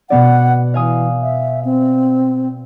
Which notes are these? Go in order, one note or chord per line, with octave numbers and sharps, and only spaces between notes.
B2 B3 D5 F#5
E3 F5 G#5 D#6
E5
C4